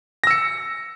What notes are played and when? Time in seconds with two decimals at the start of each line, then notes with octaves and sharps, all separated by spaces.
0.24 A#6
0.27 E6
0.31 C#7